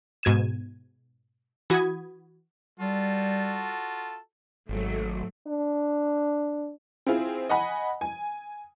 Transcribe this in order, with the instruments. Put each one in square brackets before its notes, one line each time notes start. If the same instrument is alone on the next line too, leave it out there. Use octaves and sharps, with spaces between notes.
[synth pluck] G#2 B2 G#6 D#7 E7
E3 F#4 B5 D#6 G#6
[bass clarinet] G3 [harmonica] F4 F#4 A4
[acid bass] G#1 [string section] G#2 F#3 A3
[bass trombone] D4
[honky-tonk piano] C4 E4 F4 G#4
D#5 F#5 G#5 B5
G#5